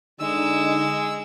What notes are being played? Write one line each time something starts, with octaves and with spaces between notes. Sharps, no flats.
D3 G#3 D#4 E6